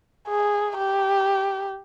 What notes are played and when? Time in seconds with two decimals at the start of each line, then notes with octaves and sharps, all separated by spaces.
0.28 G#4
0.78 G4